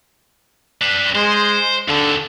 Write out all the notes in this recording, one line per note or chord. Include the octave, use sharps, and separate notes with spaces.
D4 B4
G#3 C5
D#2 D3 A4